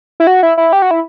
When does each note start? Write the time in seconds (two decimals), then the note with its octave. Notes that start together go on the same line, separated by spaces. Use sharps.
0.20 E4
0.27 F#4
0.43 E4
0.57 E4
0.73 G4
0.82 F#4
0.91 E4